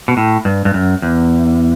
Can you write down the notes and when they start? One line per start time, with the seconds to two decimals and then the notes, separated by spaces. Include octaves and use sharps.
0.08 B2
0.17 A2
0.45 G2
0.65 G2
0.74 F#2
1.02 E2